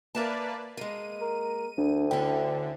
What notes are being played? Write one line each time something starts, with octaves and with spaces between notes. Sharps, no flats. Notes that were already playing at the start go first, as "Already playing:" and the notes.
A#3 A#4 B4 D5 E5 A5
G#3 A#3 D#7
A#4
D2 D4
D3 C#4 E4 G5